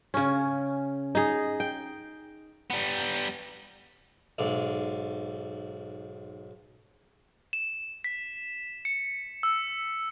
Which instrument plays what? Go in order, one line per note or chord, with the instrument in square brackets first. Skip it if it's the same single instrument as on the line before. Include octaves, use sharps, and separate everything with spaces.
[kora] C#3 C#4
D#4 G#4
G5
[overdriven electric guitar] G3 B3
[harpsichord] B1 G#2
[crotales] E7
B6
C#7
E6